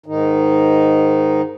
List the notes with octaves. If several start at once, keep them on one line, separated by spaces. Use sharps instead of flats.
G#2 D#3 D#4